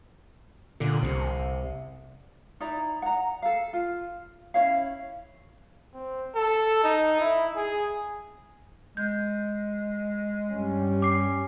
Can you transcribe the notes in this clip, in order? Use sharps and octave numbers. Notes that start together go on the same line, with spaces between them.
A#2 D3
C2 C3
D#4 E4 D5 A#5
F#5 A#5
A4 F5
F4
C#4 E4 C#5 F5
C4
A4
D#4
E4
G#4
G#3 G6
G2 G3 C#4
D6 C7